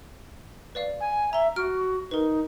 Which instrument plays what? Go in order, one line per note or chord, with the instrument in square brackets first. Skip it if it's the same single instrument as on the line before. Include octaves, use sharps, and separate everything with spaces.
[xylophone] B4 D5 F5
[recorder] G#5
[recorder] E5 [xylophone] A#5 G7
[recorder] F#4 [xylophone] F6 D7
[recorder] D#4 [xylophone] A#4 B4